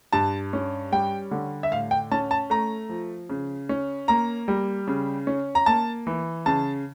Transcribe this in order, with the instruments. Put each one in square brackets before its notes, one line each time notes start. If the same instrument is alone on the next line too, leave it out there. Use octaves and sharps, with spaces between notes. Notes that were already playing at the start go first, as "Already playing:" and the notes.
[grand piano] G2 A5
C#4
G3 G5
D3
E5
A2 F5
G5
C#4 A5
A5
A3 A#5
F3
C#3
C#4
A#3 A#5
G3
C#3
C#4
A#5
A#3 A5
E3
C#3 A5